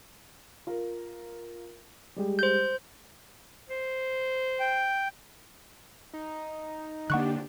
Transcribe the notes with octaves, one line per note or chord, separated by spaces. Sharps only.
F4 A#4
G3 G#3 G4
C5 G6
C5
G5
D#4
D3 A#3 D4 G4 F#5 C#6 F#6